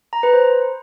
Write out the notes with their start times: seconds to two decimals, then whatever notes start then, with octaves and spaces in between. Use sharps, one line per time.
0.13 A#5
0.23 B4
0.34 C5